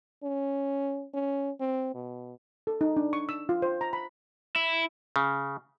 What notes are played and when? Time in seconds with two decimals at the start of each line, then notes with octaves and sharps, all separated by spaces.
0.23 C#4
1.14 C#4
1.60 C4
1.95 B2
2.67 A4
2.81 D#4
2.97 D4
3.13 C#6
3.29 E6
3.49 F4
3.62 C5
3.81 A#5
3.93 B5
4.56 E4
5.16 C#3